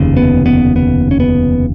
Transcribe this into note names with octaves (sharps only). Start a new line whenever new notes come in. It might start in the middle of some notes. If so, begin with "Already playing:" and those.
Already playing: F1 D#2 C#3
B3
B3
B3
C#4
B3